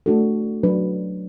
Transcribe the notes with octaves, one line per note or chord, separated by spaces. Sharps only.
A3 D4 F#4 A4
F#3 D4 B4